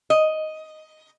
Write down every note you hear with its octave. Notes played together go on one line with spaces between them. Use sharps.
D#5